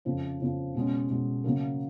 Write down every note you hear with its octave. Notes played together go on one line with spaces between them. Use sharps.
F2 C#3 F3
F2 C#3 F3
B2 G#3 C#4
B2 G#3 C#4
C#3 F#3 A#3